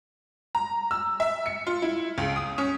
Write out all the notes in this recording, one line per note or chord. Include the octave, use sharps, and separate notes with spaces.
A#5
E6
E5
C#7
F4
E4
C#2
D#6
C#4